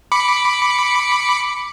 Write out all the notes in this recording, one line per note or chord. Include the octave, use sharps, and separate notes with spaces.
B5 D6 C#7